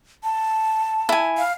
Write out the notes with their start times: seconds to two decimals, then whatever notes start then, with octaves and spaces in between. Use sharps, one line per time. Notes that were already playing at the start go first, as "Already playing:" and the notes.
0.24 A5
1.09 E4 G#5
1.38 F5